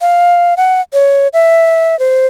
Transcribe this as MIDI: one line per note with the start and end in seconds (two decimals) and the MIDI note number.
0.01 0.55 77
0.57 0.81 78
0.93 1.28 73
1.33 1.98 76
1.99 2.27 72